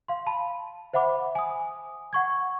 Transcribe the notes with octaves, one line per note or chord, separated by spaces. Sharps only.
F5 C6
A5 B5
C5 E5 F#5 B5 D6
G#5 D#6
F#5 C#6 G#6